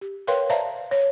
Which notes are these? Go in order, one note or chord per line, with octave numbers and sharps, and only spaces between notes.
G4
A#4 B4 C#5 F5 G5 C6
C5 D5 E5 F5 A5 A#5
C#5